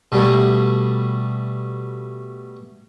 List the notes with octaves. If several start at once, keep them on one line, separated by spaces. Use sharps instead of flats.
B2 G3 A3